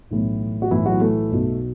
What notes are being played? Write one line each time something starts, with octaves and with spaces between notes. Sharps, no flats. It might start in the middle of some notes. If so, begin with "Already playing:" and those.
B1 A2 E3
F#4
B1 A2 E3 E4
F#3 F#4
A3 A4
B1 B2 F#3